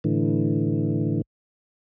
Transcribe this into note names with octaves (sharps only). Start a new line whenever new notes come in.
A2 D3 E3